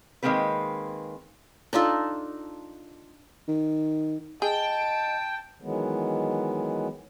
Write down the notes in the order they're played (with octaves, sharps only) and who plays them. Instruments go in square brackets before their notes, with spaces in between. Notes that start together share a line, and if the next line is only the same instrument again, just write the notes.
[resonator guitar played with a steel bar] D#3 F#3 G#3 A#3 C4 B4
[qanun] D4 D#4 F4 A4
[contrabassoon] D#3
[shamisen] G#4 [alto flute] D#5 [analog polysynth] G5 [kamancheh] A5
[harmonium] D#3 E3 F#3 G#3 B3